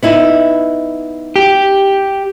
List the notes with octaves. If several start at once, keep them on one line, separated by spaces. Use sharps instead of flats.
B3 D#4 E4
G4